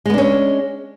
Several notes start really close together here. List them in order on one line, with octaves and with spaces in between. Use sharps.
G#3 B3 D4 C#4